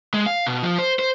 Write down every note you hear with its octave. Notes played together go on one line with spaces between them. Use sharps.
G#3
F5
B2
F3
C5
C5